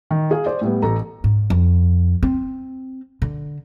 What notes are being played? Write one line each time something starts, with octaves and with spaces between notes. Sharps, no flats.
D#3
G#4 F5
C5 D5
A2 G3 B3
A1 A4 A#5
G#2
F2
C4
D3